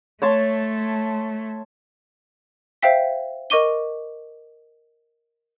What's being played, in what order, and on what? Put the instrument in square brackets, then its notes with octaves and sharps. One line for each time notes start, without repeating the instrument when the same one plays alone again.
[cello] A3 [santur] C#5 A5 C6
[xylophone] C5 E5 F5 G5 B6
A#4 D#5 C#6 D6 D#7 G7